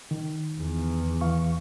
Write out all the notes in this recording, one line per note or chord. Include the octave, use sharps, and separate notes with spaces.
D#3
E2
E3 F5 C#6